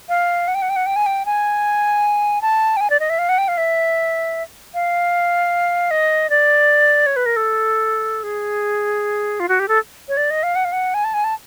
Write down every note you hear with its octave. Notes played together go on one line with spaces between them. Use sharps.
F5
F#5
G5
F#5
G5
F#5
G5
G#5
G5
G#5
A5
G5
G#5
D5
D#5
E5
F5
F#5
G5
F5
E5
F5
D#5
D5
C#5
B4
A#4
A4
G#4
F4
F#4
G4
A4
C#5
D5
D#5
F5
F#5
F5
F#5
G#5
A5
G#5
A5